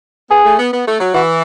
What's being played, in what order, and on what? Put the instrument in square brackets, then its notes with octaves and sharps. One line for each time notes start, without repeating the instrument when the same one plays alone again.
[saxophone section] B3 [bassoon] G#4
[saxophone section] A3
B3
B3
A3
F#3
[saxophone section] E3 [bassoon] F#4